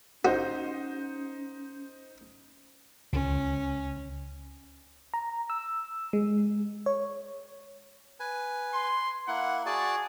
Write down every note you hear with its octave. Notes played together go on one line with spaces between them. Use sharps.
C#4 D#4 F#4 C5 D#5
C#2 C#4
A#5
E6
G#3
C#5
B4 G#5
C6
A#3 E4 F#5
F#4 G#4 D5 A5